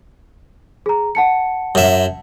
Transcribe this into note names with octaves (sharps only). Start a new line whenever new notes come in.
G#4 A#5
F#5 A5 C#7
F#2 E5